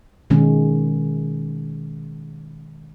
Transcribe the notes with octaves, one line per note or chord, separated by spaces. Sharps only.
B2 D#3 G#3 C#4